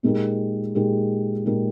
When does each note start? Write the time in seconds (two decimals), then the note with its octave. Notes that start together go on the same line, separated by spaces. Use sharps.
0.03 A#2 G#3 D#4 G4 A#4
0.75 A#2 G#3 D#4 G4 A#4
1.46 A#2 G#3 D#4 G4 A#4